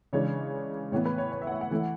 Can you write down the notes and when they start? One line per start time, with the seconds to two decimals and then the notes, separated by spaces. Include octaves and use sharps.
0.13 C#3 E3 G#3 D4 C#5
0.92 A2 E3 B3 C#5
1.06 B4
1.18 C#5
1.32 C#5
1.42 E5
1.47 F#5
1.52 E5
1.61 F#5
1.71 E3 A3 E4